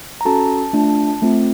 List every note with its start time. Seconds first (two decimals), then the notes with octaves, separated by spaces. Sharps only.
0.21 A#5
0.25 C#4 F#4 A4 A5
0.73 A3 D4 F4
1.22 A3 C4 F4